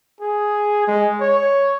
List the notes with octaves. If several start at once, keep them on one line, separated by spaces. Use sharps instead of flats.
G#4
G#3
C#5